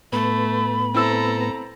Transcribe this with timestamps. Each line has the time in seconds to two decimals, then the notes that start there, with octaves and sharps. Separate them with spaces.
0.12 A2 A3 B3 B5
0.94 C4 E4 A4 A#5 E6